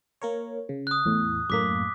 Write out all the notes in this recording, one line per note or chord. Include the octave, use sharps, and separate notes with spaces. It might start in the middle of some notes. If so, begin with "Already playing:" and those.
A#3 A#4 C#5
C#3
D#6 F#6
E2 A2
F#2 A2 A#3 D6 B6